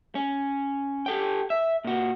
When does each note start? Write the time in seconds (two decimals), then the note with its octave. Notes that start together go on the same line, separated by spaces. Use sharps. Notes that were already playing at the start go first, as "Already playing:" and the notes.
0.15 C#4
1.06 G4 A4 G5
1.50 E5
1.84 A#2 F#4